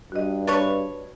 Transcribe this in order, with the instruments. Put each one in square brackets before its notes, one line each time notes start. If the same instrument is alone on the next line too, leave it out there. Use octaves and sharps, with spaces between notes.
[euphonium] G2 [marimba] F#4 D#5
[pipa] D4 B4 C#5